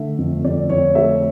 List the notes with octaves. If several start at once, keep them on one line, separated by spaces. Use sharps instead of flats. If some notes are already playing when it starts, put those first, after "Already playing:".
Already playing: D3 A3 E5
F2
F2 D5
F2 C#5
A3 E5